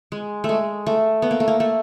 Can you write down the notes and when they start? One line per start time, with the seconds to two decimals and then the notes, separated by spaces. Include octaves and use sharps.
0.12 G#3
0.44 A3
0.49 G#3
0.87 A3
1.22 B3
1.31 A#3
1.40 A3
1.48 A#3
1.60 A3